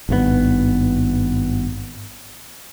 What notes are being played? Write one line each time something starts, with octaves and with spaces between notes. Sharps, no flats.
G#1 G2 B2 B3